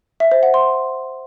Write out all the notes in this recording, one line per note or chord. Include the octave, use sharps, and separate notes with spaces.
E5
C5
F#5
C6